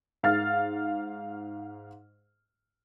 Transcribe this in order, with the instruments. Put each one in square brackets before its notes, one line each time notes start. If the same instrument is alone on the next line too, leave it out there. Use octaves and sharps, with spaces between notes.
[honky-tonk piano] G#2 F5 F6 A6